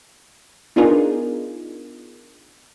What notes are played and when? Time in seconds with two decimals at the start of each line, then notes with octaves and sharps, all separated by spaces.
0.76 B3 D4 D#4 F4 G#4 A#4